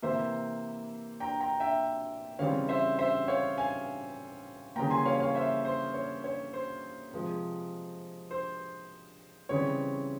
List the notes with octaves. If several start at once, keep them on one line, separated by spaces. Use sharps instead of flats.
C3 E3 A#3 C5 E5
G5 A#5
G5 A#5
E5 G5
C#3 E3 G3 C4 C#5 F5
C5 E5
C5 E5
C#5 F5
F5 G#5
C#3 E3 G3 A#3 G5 A#5
G#5 C6
C#5 F5
C#5 F5
C5 E5
C5
C#5
C#5
C5
C3 F3 G#3
C5
C#3 E3 G3 C4 C#5